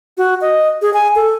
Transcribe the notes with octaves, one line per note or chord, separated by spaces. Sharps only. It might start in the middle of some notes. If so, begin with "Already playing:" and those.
F#4
D#5
G#4
G#5
A4